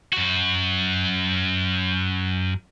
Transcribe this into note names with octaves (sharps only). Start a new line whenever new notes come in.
F#2 F#4